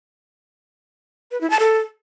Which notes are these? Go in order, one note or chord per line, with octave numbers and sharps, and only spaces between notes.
B4
E4
A5
A4